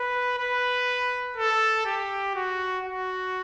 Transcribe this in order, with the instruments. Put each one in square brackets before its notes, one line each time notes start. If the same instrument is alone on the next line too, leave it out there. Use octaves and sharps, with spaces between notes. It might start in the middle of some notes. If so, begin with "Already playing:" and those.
Already playing: [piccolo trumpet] B4
B4
A4
G4
F#4
F#4